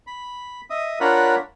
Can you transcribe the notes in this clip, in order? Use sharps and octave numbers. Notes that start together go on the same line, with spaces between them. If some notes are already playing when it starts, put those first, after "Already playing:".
B5
D#5 E5 D#6
D4 F4 A#4 C#5 F#5 B5